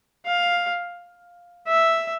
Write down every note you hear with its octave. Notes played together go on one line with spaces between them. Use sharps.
F5
E5